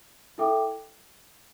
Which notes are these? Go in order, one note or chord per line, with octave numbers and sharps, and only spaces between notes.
E4 A4 E5 G5 D6